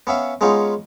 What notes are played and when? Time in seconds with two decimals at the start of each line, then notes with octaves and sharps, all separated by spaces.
0.07 B3 C#4 E5 F5
0.41 G#3 B3 C#4 D#4 F4